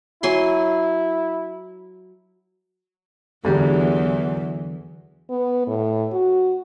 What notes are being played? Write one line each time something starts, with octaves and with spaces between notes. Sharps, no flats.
F#3 E4 G#5 C6
E2 G#2 D3 E3 F#3 G3 A4
B3
A2
F#4